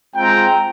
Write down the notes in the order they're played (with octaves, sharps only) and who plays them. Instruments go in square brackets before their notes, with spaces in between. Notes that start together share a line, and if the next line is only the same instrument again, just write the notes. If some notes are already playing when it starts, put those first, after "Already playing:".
[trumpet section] G#3 C4 F4 G5 A#5